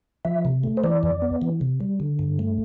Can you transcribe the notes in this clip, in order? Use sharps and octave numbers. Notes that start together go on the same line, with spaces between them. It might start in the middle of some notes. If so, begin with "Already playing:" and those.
F3 E5
C3
A3
C5
E3 D5
F2
B3
E3
C3
G3
D3
G2
A3